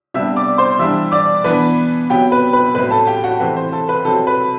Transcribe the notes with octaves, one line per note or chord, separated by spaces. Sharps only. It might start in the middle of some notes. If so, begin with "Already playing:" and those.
C3 G3 B3 D4 E5 E6
D5 D6
C5 C6
E3 G3 D4 E5 E6
D5 D6
E3 B3 D4 B4 B5
C3 F#3 B3 G4 G5
B4 B5
B4 B5
A2 F#3 C4 E4 B4 B5
A4 A5
G4 G5
F#4 F#5
C3 E3 A3 C4 B4
C5
A4 A5
B4 B5
C3 F#3 C4 A4 A5
B4 B5